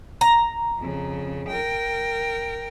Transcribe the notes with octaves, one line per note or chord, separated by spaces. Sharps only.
A#5
F2 C#3
A#4 G5